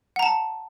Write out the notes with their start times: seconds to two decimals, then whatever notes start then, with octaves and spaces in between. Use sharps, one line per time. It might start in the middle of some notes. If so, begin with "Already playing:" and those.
0.16 F#5
0.19 A#5
0.23 A5